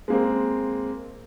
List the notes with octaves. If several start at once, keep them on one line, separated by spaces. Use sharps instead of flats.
G#3 A#3 C4